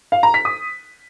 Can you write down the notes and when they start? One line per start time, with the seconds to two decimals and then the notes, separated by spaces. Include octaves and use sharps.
0.12 F5
0.23 A#5
0.34 B6
0.45 D#6